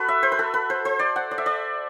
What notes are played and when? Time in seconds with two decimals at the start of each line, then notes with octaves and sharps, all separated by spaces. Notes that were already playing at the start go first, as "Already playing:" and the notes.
Already playing: F#4 A4 B4
0.08 E5
0.23 C5
0.32 B4
0.39 A4
0.54 B4
0.70 C5
0.85 C5
0.99 D5
1.16 F#5
1.31 D5
1.38 E5
1.46 D5